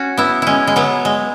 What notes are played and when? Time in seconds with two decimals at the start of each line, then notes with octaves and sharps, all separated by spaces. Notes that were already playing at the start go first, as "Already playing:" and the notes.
Already playing: C#4 F#4
0.17 B3 E4
0.42 G#3 C#4 E4
0.67 G#3
0.76 F#3 B3
1.05 G#3